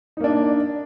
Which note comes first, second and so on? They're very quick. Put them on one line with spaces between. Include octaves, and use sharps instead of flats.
D#4 A#3 D4